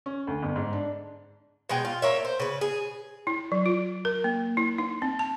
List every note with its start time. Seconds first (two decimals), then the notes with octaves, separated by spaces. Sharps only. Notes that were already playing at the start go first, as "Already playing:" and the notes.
0.06 C#4
0.27 D2
0.43 G1
0.56 G#2
0.73 D4
1.69 B2 G#3 G#4 G5
1.85 F4
2.02 A#3 C#5 E5
2.25 C5
2.40 C#3 B4
2.61 G#4
3.27 E4
3.52 F#3
3.66 F4
4.05 A#4
4.24 A#3
4.57 E4
4.78 D#4
5.02 C4
5.19 A5